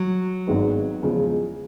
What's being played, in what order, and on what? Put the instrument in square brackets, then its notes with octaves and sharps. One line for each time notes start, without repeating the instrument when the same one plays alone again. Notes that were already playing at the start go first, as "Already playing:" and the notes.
Already playing: [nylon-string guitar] F#3
[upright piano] G#1 G#2 D#3 G#3 B3
E2 C#3 F3 G#3